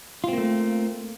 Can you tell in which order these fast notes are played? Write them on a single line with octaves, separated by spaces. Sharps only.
F4 C4 A#3 A3